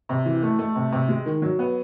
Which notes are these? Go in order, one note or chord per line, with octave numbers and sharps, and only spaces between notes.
C3
E3
A3
A3
C3
C3
G#3
D#3
F#3
B3